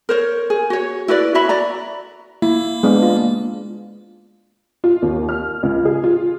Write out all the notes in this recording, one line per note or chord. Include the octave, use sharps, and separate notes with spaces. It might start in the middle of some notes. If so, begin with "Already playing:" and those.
A#4 C5 C#5
G#4
F#4 C#5
E4 F#4 B4 D5
F#4 C#5 E5 B5
F#4 D5 A#5
A#3 E4
G#3 B3 D4
F4
F4
D#2
F6
C#2
G#4
F4